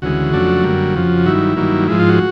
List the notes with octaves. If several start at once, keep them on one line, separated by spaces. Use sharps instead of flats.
D2 C#3 E3 G#3 F#4
F2 C#3 F#3 A3 D4
F#2 D3 G3 A#3
F2 C#3 F3
G2 D#3 F#3 E4
G2 D#3 F#3 A#3
G#2 F3 G#3 E4
F4
F#4